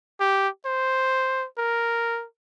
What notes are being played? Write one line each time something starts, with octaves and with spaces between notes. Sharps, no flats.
G4
C5
A#4